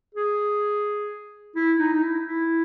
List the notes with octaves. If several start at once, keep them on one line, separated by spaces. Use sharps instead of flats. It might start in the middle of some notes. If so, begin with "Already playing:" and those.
G#4
E4
D#4
D#4
E4
E4